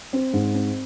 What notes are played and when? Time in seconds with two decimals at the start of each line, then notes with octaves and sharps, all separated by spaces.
0.13 C4
0.34 G#2
0.54 C4